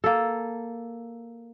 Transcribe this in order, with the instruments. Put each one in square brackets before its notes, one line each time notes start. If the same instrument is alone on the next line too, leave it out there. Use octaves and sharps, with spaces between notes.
[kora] A#3 A4